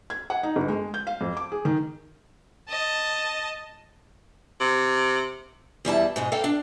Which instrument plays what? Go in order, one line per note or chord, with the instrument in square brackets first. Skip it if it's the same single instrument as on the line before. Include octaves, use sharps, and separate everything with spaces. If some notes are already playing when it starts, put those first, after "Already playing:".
[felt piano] G#6
F#5
D#4
G1
G#3
G6
F5
F2
D6
G#4
D#3
[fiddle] D#5 A5
[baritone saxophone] C3
[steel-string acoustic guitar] E2 G3 E4 A5
G#2 B2 G#3
A#3 A4 F5 G5
D4